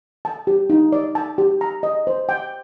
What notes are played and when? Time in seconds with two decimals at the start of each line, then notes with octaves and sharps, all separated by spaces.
0.25 A5
0.47 G4
0.70 D#4
0.93 D5
1.15 A5
1.38 G4
1.61 A#5
1.83 D#5
2.07 C5
2.29 G5